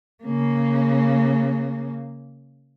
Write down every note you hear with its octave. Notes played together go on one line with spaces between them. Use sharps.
C#3 A#3